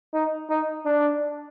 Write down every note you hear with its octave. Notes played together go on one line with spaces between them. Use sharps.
D#4
D#4
D4